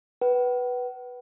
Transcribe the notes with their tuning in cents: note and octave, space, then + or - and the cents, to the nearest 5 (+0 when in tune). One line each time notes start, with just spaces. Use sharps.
B4 -5 F#5 +45